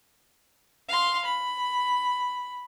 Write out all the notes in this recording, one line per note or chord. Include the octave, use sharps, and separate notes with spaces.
F5 C6
B5